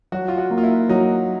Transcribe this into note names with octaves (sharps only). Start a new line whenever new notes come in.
F#3 F#4
F4
F#4
A#3
F4
E4
F#3 D#4